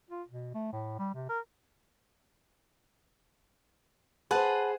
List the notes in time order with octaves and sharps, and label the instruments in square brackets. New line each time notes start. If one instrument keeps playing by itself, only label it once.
[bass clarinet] F4
B2
A3
A2
G3
C3
A#4
[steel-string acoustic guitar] G#4 C5 [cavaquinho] B4 F#5 A5